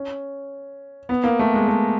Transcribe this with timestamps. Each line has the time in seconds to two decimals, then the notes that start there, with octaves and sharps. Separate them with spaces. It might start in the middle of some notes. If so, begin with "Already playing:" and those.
Already playing: C#4
1.09 B3
1.24 A#3
1.39 A3
1.54 G#3
1.68 A3